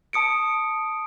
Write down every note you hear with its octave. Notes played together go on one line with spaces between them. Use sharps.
A5 D#6 C#7 D7